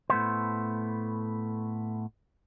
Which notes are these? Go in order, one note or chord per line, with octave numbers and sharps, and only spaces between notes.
A2 A3 B3 C5